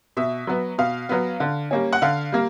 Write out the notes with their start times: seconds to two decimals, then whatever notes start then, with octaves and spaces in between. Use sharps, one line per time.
0.17 B2 E5
0.47 F#3 B3
0.78 B2 F5
1.09 F#3 B3
1.40 D3
1.71 G3 A#3 C#4
1.93 F#5
2.02 D3 F5
2.32 G3 A#3